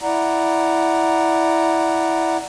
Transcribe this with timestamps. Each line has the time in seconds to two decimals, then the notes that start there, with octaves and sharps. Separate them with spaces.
0.02 E4 D5 F#5 A#5